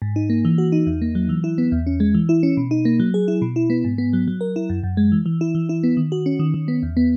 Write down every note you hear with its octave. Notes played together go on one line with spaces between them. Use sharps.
G#2
D#4
A#3
E3
F#4
D#4
E2
A#3
F#3
E3
E4
B3
E2
C#4
G#3
E3
E4
C#4
B2
D#4
A#3
F#3
G#4
E4
B2
E4
B3
G#2
B3
F#3
F#3
A#4
E4
F#2
F#2
G#3
E3
E3
E4
E3
E4
B3
D#3
F#4
C#4
D#3
D#3
B3
E2
B3